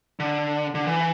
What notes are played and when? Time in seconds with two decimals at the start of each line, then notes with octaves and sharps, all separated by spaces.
0.20 D3
0.75 D3
0.87 E3